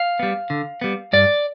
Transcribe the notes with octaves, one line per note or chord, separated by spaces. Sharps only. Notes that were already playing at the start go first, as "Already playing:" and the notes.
Already playing: F5
G3 B3
D3
G3 B3
G2 D5